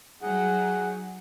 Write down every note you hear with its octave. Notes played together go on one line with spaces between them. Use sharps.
F#3 D#4 G#4 F#5